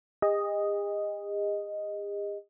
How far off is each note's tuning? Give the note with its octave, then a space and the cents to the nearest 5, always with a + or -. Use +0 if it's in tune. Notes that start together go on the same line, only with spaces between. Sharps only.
G#4 -45 D#5 +0